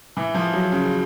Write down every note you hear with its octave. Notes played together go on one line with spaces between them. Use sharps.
E3
F3
F#3
C#3